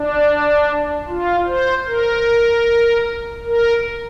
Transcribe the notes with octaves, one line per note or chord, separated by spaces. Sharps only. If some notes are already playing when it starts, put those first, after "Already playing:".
Already playing: D4
F4
C5
A#4
A#4